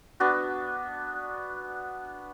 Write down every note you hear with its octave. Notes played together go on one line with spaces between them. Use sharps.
B3 D4 F#4